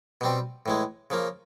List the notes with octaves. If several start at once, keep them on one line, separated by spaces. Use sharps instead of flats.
B2 G3 C4
A2 E3 G#3
C#3 F3 A#3